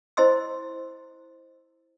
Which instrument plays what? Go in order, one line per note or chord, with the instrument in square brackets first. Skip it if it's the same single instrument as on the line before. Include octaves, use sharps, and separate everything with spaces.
[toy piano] E4 C5 D#5 C6 E6